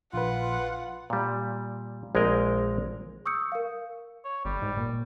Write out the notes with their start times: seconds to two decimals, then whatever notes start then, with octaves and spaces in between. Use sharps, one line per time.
0.13 A#1 F4 B4 F#5
1.10 A#2 G3
2.15 A#1 G#3 C4 A#4 D#5
3.26 C#6 D#6 E6 G6 C#7
3.52 A#4 F5
4.25 C#5
4.45 G1 G3
4.62 G#2
4.77 A#2